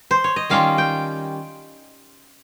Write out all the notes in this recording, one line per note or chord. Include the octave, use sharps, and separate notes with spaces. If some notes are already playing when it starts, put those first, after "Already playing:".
Already playing: A#4
C5
C#5
D#5
D#3 G3 C#4 F4 F5
G5